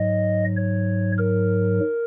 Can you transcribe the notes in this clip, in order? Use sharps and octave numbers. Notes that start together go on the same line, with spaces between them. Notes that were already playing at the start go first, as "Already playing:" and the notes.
Already playing: G#2 F#3 D#5
C#5
A#4